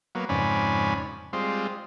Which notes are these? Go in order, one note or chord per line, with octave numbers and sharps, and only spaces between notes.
F#3 A#3 B3
F2 G#2 C#3 C#4 D5 B5
G3 G#3 C4 F4